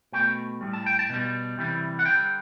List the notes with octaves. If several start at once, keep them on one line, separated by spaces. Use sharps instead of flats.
B2 A3 G5
A2 G3
A5
G5
A5
B2 G3
C3 E3 G3
F#5
D3 G3 G5